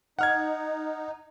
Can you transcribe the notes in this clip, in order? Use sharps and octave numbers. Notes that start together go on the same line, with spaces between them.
D#4 F#5 F6 G#6